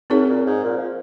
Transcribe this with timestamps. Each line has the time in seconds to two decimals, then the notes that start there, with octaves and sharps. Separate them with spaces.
0.10 F#2 C4 D#4 G#4 C#5
0.28 A#2
0.47 G#2
0.64 A#2
0.78 F3